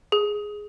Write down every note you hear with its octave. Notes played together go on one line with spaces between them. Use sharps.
G#4